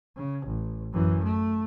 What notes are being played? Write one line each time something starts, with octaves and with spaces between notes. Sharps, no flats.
C#3
A1
F#2 E3
A3